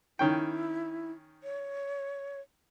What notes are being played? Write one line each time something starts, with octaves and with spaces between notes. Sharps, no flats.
D#3 C#4 E4 G5
C#5